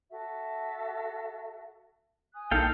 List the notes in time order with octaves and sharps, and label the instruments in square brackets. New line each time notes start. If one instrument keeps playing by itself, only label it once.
[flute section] F#4 A4 E5
G#5 D#6 F#6
[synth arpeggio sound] A#1 D#4 [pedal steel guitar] A4 F5 G5 [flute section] A#4